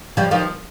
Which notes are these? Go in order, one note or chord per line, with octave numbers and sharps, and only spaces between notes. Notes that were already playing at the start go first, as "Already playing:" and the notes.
F3 G3
D#3 F3